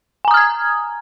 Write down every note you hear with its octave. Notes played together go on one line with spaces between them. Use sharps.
G#5 A#5 D#6 F6 G#6